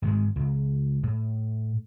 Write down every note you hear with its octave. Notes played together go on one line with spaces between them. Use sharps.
G#2 D#3 F3 G#3
C#2
A2